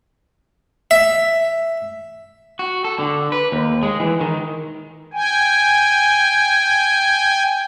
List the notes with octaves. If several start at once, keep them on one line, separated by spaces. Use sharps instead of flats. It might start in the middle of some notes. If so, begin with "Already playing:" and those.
E5
F#4
A4
D3
B4
D#2
G#3
E3
D#3
G5 G#5